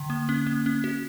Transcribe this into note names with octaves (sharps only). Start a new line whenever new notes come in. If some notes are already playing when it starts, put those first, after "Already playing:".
Already playing: D3
A#3
C#4
A#3
C#4
F#4